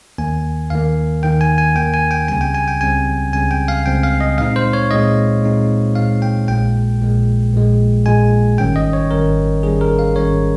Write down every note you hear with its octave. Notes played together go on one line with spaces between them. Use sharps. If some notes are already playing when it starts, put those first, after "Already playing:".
D#2 D#3 A#3 G#5
D#2 D#3 A#3 F5
D#2 D#3 A#3 G5
G#5
G#5
D#2 D#3 A#3 G5
G#5
G5
C#2 C#3 G3 C4 G#5
G5
G#5
G5
C#2 C#3 G3 C4 G#5
C#2 C#3 G3 C4 G#5
G5
F5
C#2 C#3 G3 C4 G5
F5
D#5
A#2 G#3 C4 D#4 F5
C5
C#5
A#2 G#3 C4 D#4 D#5
A#2 G#3 C4 D#4
A#2 G#3 C4 D#4 F5
G5
A#1 A#2 G#3 G5
A#1 A#2 G#3
A#1 A#2 G#3
A#1 A#2 G#3 G#5
G#1 G#2 D#3 G3 C#4 G5
D#5
C#5
G#1 G#2 D#3 G3 C#4 A#4
G#1 G#2 D#3 G3 C#4 G#4
A#4
F5
G#1 G#2 D#3 G3 C#4 C#5